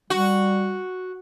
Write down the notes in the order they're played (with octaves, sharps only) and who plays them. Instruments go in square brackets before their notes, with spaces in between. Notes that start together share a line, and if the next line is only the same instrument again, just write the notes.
[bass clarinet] G3 [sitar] F#4